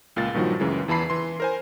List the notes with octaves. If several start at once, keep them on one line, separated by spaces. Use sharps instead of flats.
C#2 A#2 F5 A6
G2 A#2 D#3 F3 F#3 F#4
C#2 F#2 C#3 E3 G#3
E2 E3 A5 B5 C7
E3 C6
A#4 C5 G#5